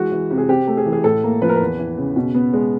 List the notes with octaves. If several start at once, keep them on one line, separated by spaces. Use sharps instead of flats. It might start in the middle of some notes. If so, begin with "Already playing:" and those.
Already playing: E3 G#3 F#4
E3
C3
G#4
C4 G4
A3
G#4
E3
G#4
A2 A4
A#3
F3 B4
A#4
E2 B4
E3
C#3
B2
B3
G#3